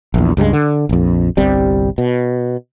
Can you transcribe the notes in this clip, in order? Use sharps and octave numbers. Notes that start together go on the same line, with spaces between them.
A#1 E2
C#2 G2 G3 G#3
D3
A#1 F2
G1 C2 C3 G3
B2